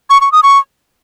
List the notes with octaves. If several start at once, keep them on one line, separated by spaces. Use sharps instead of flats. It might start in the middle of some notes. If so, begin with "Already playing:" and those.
C#6
C#6
D#6
C#6